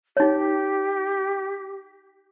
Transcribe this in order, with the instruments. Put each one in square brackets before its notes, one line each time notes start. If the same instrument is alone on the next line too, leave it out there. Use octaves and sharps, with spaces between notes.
[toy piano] D#4 C#5 [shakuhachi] G4